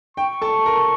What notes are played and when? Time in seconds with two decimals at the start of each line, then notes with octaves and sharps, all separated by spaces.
0.17 G5 C#6
0.42 A4 A5
0.66 A#4 A#5